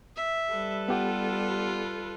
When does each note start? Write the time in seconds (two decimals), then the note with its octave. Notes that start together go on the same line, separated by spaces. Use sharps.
0.16 E5
0.52 G3 A4 B4
0.88 B3 F4 G4 F#5